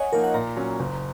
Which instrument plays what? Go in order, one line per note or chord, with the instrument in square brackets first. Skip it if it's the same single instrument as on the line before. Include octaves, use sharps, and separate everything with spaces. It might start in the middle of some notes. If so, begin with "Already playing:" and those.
Already playing: [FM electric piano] C#5 D#5 F#5 G#5
[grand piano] F3 A#3 D#4 [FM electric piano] A#4
[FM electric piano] F#5
[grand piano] A#2 [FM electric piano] A#5
[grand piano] F#3 C#4
F#1